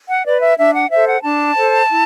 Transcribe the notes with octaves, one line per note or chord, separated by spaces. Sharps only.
F#5
B4 D5
E5
D4 E5
F#5
A4 C5 E5
F#5
D4 A5
A4 C5
E4